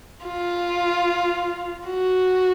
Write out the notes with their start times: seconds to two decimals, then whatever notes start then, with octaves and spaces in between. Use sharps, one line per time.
0.26 F4
1.88 F#4